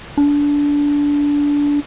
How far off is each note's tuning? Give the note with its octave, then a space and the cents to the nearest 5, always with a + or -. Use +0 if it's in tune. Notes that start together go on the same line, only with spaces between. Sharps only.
D4 -20